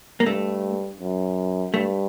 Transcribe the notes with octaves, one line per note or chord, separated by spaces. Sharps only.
A#3
G2 A3
F#2
G2 A3